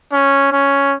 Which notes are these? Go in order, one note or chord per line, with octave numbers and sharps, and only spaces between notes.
C#4
C#4